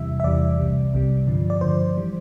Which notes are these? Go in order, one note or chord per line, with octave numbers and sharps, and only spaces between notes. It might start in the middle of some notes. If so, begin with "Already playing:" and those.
Already playing: E2 C3 E3 G3 E5
E5
E2 C3 E3 G3 D5
C2 C3 G3
C2 C3 G3
G2 D3 F3
D5
G2 D3 F3 C5
E3 G3